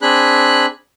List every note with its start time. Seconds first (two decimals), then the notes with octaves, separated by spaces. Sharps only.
0.02 C4 D4 G#4 B5 F#6